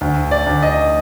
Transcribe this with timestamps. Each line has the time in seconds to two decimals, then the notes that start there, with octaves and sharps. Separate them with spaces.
0.01 D2
0.31 D5
0.46 D2
0.62 D#5